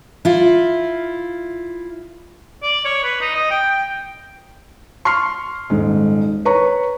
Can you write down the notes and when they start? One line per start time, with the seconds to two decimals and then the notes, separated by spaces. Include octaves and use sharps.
0.25 E4 F4
2.63 D5
2.85 C#5
3.03 B4
3.21 D#4
3.35 D#5
3.51 G5
3.71 G5
5.05 C6 C#6 F6 C7
5.70 D#1 G#2
6.45 B4 C#5 A#5 C#6